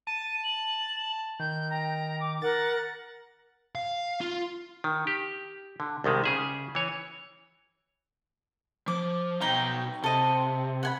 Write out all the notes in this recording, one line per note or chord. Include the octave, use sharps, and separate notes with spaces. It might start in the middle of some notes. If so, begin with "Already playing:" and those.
A5 D#7
F#7
D#3 G6
G5 A#5
D6
A#4 F#5 A6
F5
F4
D#3
G4
D3
C2 C3 D#3 G#3
C#3 G#4 E5
E3 C#5
F3 D6
B2 D#4 G5 A#5
C3 A4 D#5
F#5 G#5 B5